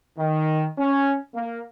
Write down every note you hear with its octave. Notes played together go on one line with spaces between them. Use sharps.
D#3
C#4
A#3